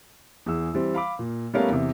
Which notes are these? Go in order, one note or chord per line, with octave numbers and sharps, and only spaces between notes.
E2 G#4 E6
E3 G3 C4
F5 B5 D6
A#2
G3 A3 B3 C#4 A#4 F5
E2 C3